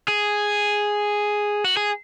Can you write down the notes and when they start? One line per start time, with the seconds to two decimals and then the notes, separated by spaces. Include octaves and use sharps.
0.08 G#4
1.64 F#4
1.77 G#4